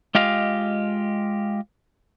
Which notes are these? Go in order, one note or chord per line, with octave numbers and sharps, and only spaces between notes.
G#3 F4 G4 D#5 F5